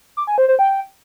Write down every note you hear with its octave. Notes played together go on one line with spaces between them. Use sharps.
D6
G#5
C5
C5
G5